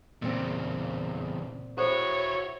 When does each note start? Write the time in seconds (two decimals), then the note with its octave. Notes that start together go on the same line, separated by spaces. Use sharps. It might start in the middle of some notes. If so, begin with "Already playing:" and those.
0.22 E2 A#2 C#3 C4
1.78 E4 F#4 A4 C5 C#5